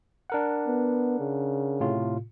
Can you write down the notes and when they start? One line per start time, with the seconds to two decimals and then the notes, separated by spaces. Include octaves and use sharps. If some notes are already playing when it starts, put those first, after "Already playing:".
0.30 D4 A#4 F#5
0.67 B3
1.20 C#3
1.80 A2 C3 F4